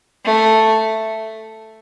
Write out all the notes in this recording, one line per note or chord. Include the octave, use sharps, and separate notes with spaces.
A3